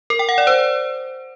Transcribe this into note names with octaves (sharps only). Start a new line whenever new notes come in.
A#4
G5
F#5
D5
C5